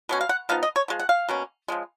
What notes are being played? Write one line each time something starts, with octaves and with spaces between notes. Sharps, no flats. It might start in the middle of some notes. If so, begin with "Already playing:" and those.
B2 F#3 C#4
F5
F#5
F3 B3 D#4 F5
D#5
C#5
F3 G#3
F#5
F5
B2 A#3 C#4
C#3 F3 G#3